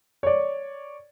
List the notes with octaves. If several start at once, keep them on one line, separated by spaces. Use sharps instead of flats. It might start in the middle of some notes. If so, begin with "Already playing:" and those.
C#5 D5